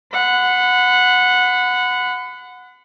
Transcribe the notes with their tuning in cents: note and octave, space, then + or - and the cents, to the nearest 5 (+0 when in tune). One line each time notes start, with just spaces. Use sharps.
F#5 -10 B5 +35